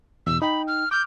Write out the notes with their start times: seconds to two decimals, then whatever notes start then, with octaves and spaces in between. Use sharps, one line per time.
0.27 E2 B2 E6
0.42 D#4 G5 B5
0.68 F6
0.91 D6 F6 G6